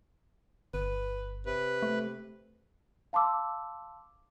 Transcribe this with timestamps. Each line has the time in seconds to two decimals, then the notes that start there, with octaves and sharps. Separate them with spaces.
0.74 G1 B4
1.46 C3 B4
1.82 A3
3.13 F5 A5 C6 D6 E6